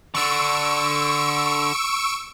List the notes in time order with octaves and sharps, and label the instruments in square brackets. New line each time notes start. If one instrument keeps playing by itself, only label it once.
[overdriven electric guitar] D3 D4 [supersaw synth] C#6 E6 D7